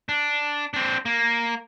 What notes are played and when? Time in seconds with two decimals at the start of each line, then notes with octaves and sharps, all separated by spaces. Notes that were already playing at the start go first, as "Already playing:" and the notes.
0.09 D4
0.74 C4 D4
1.06 A#3